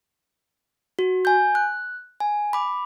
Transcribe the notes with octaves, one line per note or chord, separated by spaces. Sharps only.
F#4
G#5 G6
F#6
G#5
B5 D6